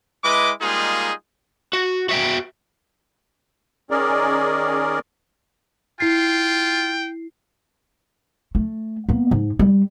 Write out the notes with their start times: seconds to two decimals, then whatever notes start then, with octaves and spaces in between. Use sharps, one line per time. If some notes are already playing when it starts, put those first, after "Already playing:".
0.24 G#3 E4 B4 D#5 D6
0.62 G3 G#3 A#3 D#4 F4 G#4
1.73 F#4
2.09 F#4 E5 G5
3.90 D#3 C#4 G#4 A#4 D5
6.00 E4 F4 G5 C7
8.55 A3
9.09 A#3 B3
9.31 G#2
9.59 G3